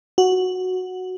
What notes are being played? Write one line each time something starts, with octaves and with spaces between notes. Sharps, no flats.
F#4